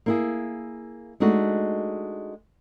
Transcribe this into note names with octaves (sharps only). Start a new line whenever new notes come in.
A#3 E4 G#4
G#3 A3 D4 D#4 F#4